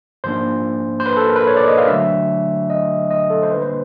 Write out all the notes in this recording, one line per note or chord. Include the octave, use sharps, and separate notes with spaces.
G#2 F3 A#3 D4 C5
C5
B4
A4
A#4
B4
C#5
D5
D#5
F5
D3 F#3 A3 D4 E5
D#5
D#5
A4
C5
D3 G3 A#3 D4 B4
C5